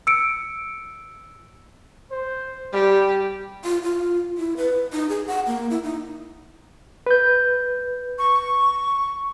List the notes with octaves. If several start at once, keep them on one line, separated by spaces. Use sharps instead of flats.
E6 C#7 D7
C5
G3 G4
F4
F4
E4
B4
D#4
G#4
F#5
A#3
E4
D#4
B4 G6
C#6